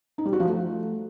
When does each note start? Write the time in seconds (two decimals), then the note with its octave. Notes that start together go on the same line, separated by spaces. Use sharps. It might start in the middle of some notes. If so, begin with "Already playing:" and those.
0.18 D#4
0.25 G3
0.33 F#4
0.40 F3
0.47 A3